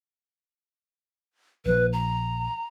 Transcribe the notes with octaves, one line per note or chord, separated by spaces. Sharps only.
A#1 F3 B4
A#5